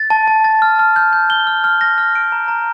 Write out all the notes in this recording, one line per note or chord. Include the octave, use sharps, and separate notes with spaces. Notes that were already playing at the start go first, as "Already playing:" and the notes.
Already playing: A6
A5
A5
A6
F6
F6
G6
G6
G7
F6
F6
A#6
F6
D7
A#5
A#5